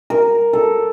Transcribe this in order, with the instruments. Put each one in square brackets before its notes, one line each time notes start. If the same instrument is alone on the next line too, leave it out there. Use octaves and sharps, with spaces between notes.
[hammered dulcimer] A#4
A4